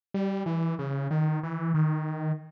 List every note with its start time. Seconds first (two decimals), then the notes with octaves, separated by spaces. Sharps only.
0.14 G3
0.46 E3
0.79 C#3
1.11 D#3
1.43 E3
1.74 D#3